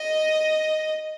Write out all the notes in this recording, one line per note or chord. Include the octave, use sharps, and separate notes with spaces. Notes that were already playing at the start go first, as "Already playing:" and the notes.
Already playing: D#5